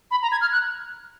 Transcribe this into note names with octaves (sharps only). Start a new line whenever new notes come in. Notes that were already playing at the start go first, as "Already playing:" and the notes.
B5
A#5
G#6
F6
F#6